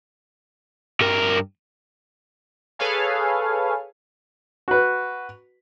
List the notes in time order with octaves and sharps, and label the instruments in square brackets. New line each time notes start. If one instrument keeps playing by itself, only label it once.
[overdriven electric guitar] G2 A#4
[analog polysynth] G#4 A4 B4 C#5 F5 G#5
[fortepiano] F#4 B4